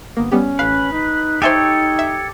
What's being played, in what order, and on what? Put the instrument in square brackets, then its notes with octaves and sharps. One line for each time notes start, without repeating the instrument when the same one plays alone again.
[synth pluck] G1 A#3 [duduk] B3
[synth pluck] G3 B3 G4 [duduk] C#4
[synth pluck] A1 F5 [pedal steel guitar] B4
[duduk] D#4
[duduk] D#4 [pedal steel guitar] G4 A4 C#5 [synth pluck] C5 E5 G#5
[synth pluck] E5